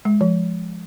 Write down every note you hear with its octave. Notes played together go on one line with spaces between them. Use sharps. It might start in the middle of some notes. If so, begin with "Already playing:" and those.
G#3
F3